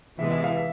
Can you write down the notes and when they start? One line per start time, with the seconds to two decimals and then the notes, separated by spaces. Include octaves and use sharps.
0.19 C3 E3 G#3 B3 E5
0.31 E5
0.44 F5
0.57 E5